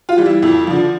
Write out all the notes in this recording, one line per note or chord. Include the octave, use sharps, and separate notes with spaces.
F4
E3 G3
E4
F2 E4
D3 F3